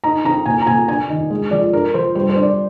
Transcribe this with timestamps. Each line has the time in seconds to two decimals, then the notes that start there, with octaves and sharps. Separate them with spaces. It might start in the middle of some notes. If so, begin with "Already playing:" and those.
0.04 D#4 A#5
0.25 C4 A#5
0.46 A#2 G#5
0.62 A#5
0.67 A#2 G#5
0.88 D4 G#5
1.09 D#3
1.30 G#3
1.51 F3 D5
1.73 D4 A#4
1.94 F3 C5
2.15 G3 C5
2.30 C5
2.36 D4
2.43 D5